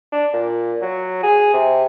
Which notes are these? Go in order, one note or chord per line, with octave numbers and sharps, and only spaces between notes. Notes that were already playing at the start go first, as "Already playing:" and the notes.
D4
A#2
F#3
G#4
C3